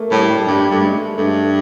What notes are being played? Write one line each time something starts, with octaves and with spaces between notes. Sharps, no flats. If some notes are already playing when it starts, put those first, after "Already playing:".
Already playing: A3 A#3
A2 G3
G3
G2 G3
G2 A3
G#3
G2 A3